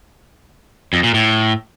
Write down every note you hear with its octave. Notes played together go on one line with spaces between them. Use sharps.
F2
A#2
A2